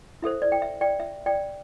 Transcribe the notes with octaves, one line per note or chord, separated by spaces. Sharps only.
E4 A4 C5 E5
D5
G5
E5
D5 G5
E5
D5 G5